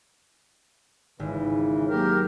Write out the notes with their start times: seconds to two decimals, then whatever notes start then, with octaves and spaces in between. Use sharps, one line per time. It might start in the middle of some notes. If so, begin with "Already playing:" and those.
1.19 G#1 C#3 E3
1.89 F#3 A#3 G4 A#4